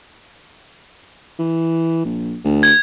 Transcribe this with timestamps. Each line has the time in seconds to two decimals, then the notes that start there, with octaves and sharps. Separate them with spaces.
1.39 E3
2.05 A#1
2.44 D2
2.63 G#6